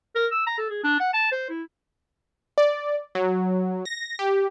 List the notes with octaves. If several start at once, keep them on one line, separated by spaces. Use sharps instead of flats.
A#4
E6
A#5
A4
G#4
D4
F#5
A5
C5
E4
D5
F#3
A#6
G4